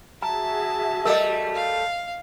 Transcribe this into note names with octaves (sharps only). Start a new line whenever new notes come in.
F#4 G#4 E5 A5 A#5
G3 A3 A4 A#4 D#5
F5